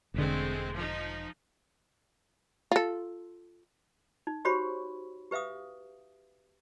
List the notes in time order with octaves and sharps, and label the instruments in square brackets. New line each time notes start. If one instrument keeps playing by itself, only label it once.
[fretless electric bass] E1 D3 [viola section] G#3 A3 C4
[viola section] F3 D#4
[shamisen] F4 A4
[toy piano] D#4
F#4 G4 C5 C#5 B5 C#6
G4 B4 E5 F5 D#6